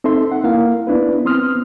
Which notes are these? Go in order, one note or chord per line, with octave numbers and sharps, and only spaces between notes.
C4 D#4 A4 E5 C6
F#5
A#3 E4 A#4 F5
B3 D4 E4 B4
B3 C4 C6 D#6 F6